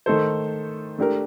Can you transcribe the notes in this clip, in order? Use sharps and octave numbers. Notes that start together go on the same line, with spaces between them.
D#3 A3 D#4 A4 C5
A3 D4 G4 A#4